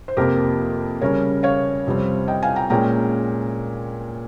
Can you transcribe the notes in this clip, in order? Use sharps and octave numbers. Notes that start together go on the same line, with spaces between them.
C5
F2 C3 F3 A#3 G4 A#4
C#3 G3 C#4 A#4 C#5
C#5 F5
F2 C3 G3 C4
D#5 G5
F5 G#5
G5 A#5
A#2 G#3 C#4 G5 A#5